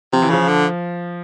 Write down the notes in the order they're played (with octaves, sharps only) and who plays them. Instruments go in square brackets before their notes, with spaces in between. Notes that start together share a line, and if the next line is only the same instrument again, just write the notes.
[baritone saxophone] C3 [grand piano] F3
[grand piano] E3
[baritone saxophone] C#3 [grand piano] F3
[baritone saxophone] D3